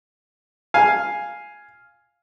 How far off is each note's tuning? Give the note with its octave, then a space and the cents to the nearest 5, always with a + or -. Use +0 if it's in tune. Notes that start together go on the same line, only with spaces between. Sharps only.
F5 +0 G#5 +0